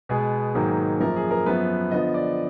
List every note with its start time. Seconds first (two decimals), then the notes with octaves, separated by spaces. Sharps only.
0.09 B2 G#3 B3 G#4
0.55 G#2 D#3 F#3 A#3
1.00 F#2 F3 A#3 A#4
1.16 G#4
1.31 A#4
1.46 F#2 F3 B3 B4
1.91 D3 F3 B3 D#5
2.14 D5